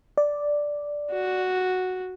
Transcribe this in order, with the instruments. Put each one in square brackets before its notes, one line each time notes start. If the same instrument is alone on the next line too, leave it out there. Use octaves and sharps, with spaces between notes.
[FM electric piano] D5
[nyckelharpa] F#4